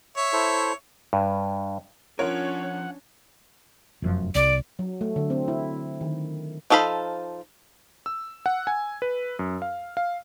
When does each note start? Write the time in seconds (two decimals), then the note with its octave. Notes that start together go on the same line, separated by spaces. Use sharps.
0.17 C#5 E5
0.33 E4 A4 C5
1.13 G2
2.19 F3 C#4 D4 F4 A#4 C#5 F#5
4.02 F1 F#2 F3
4.35 C2 D5
4.79 F#3
5.01 A3
5.16 D3
5.30 C4
5.48 E4
6.01 D#3
6.70 F3 D#4 A4 F5 B5
8.06 E6
8.46 F#5
8.67 G#5
9.02 B4
9.39 F#2
9.62 F5
9.97 F5